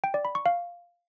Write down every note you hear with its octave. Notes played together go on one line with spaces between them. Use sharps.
G5
D5
B5
C#6
F5